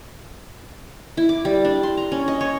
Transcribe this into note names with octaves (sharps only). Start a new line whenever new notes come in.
E4
D6
G3
D4
C6
A#5
C#4
D#5
C#5